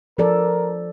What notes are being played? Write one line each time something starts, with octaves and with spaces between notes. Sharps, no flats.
F3 A4 A#4 D5